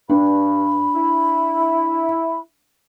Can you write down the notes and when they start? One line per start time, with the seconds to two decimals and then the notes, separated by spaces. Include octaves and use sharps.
0.09 G2 D4 B5
0.95 E4